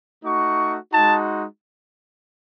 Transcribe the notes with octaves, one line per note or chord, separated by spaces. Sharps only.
A3 D#4 F#4 C#6
G#3 D#4 F#4 A5